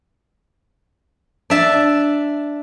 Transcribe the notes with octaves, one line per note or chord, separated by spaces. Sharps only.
D4 E5 A5